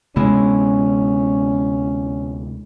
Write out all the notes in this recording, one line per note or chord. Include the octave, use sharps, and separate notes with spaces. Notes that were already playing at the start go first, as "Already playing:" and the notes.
D2 C3 G#3 B3 C#4 E4